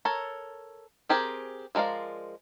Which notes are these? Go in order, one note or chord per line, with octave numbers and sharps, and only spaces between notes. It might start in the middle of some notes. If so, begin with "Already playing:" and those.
A4 A#4 C#5
C4 G4 G#4 A#4
F3 G#3 A#4 D5 F5